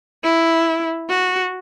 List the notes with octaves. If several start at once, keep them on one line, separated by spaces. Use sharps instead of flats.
E4
F#4